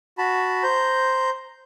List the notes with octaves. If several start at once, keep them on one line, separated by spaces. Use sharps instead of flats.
F#4 A5 B5
C5 A#5 G6